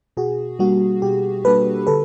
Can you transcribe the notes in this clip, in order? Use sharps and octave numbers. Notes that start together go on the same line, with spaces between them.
B2 F#4 G#4
G3 A#3 D4 F#4
B2 G4
G3 A#3 D4 A4 B4
D3 A4 B4